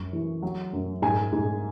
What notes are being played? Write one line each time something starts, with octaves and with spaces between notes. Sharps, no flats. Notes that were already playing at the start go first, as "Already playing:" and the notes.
Already playing: F#2 C#6
E3
F#3
F#2
G#2 G#5
G#2